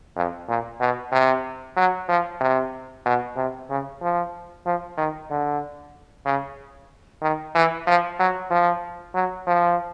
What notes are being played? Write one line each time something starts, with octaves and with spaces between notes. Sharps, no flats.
F2
A#2
B2
C3
F#3
F3
C3
B2
C3
C#3
F3
F3
D#3
D3
C#3
D#3
E3
F3
F#3
F3
F#3
F3